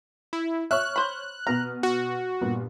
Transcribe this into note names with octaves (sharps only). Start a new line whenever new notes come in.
E4
C#5 E5 C#6 F6 F#6
C5 B5
B2 B3 A#5 F6
F#4
G2 A#2 B3